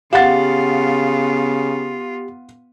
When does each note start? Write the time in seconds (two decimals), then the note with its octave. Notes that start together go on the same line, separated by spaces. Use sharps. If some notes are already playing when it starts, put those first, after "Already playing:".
0.13 C#3 B3 F4 G4 F5 F#5 A6